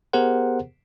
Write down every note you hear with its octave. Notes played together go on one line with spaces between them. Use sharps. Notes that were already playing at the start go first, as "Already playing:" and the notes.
B3 G4 G#4 A#4 C5 F#5